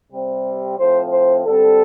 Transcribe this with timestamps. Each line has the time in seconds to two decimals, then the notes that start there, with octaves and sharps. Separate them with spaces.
0.11 C3 G3 C4
0.78 A2 F3 C4 C5
1.11 C5
1.45 D3 G3 C4 A4